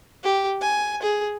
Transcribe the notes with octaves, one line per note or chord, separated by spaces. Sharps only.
G4
G#5
G#4